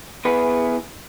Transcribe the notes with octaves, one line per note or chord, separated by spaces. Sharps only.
B3 E4 G#4 B4